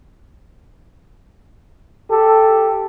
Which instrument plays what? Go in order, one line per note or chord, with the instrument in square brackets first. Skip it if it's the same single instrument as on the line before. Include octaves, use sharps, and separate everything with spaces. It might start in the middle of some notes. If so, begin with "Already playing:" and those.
[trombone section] G4 A4